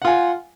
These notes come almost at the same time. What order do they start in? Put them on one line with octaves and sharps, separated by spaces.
F#5 F4 G#5